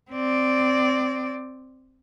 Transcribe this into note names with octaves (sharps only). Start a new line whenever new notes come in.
C4 D5